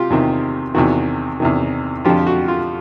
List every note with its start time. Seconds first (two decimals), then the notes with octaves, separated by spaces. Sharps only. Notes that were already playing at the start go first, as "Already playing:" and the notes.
Already playing: C3 F4 G4
0.10 E2 C3 D#3
0.75 E2 C3 D#3 F#4
1.40 E2 C3 D#3
2.05 F2 D3 F3 F4 G4
2.27 F#4
2.48 F4